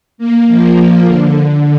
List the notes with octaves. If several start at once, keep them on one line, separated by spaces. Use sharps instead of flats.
A#3
F3
D3